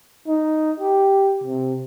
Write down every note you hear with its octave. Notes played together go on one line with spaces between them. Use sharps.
D#4
G4
C3